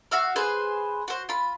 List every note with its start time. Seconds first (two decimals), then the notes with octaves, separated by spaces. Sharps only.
0.11 F#4 E5 F5
0.36 G#4 B4 C5 G#5
1.08 F#4 C5
1.29 F4 B5